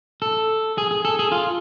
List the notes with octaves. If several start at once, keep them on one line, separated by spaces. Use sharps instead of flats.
A4
G#4
G#4
A4
G#4
F4